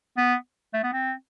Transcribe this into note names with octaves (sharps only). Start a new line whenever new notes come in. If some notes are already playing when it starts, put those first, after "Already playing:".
B3
A3
B3
C4